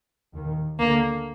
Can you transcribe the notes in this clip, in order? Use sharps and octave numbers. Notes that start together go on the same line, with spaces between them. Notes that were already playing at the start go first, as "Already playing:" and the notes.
D#2 D#3
D2 D3 A#3